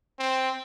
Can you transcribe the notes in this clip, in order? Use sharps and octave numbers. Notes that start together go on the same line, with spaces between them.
C4